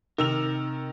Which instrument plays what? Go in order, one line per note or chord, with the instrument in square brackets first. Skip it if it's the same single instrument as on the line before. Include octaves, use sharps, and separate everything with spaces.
[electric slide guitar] C3 A#4 [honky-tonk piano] D#3 E6 F7